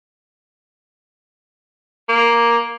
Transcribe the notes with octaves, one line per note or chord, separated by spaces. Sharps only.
A#3